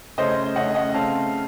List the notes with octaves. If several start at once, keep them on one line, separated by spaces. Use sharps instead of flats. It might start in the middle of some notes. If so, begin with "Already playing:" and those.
C#3 A3 C#4 C5 D#5
C#3 A3 C#4 D#5 F#5
D#5 F#5
C#3 A3 C4 F5 A5